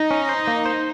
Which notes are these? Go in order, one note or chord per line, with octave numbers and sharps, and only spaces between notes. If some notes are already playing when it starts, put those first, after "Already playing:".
Already playing: D#4
C#4
C5
A#3
C5